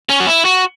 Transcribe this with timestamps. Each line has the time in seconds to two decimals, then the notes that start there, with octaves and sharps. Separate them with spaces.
0.09 C#4
0.20 F#4
0.27 E4
0.45 F#4